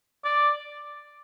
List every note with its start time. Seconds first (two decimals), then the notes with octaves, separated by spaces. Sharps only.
0.25 D5